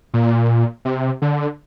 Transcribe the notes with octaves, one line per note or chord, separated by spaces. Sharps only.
A#2
C3
D3